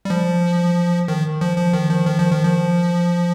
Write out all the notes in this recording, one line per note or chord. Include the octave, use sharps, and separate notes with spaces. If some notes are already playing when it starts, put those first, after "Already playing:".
G3
F3
D#3
F3
F3
D#3
F3
D#3
F3
D#3
F3